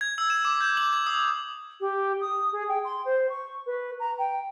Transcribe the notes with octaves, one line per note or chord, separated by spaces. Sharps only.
G#6
E6
E7
D6
G6
F#7
G#6
D#6
G4
D#6
G#4
G5
C6
C5
C#6
B4
A#5
G5